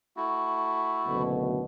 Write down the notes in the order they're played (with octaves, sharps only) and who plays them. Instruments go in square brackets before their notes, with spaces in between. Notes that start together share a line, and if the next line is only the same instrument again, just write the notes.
[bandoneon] A3 E4 F#4
[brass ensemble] F#1 D2 B2